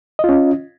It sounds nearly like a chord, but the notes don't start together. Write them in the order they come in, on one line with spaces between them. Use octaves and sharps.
D#5 F4 C#4